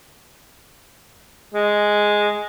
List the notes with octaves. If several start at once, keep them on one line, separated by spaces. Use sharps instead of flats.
G#3